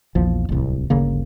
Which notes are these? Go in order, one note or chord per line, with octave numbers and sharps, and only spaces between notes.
A#1 E2 F3
D1 C2
G1 D2 C#3 A#3